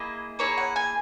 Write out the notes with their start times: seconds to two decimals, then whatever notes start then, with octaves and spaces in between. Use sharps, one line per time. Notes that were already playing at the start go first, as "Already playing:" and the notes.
Already playing: A#3 E4 G#4 D#5
0.39 A#3 E4 G#4 C#5
0.57 F#5
0.76 G#5